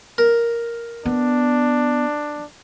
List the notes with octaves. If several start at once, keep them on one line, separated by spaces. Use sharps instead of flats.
A#4
B3 D4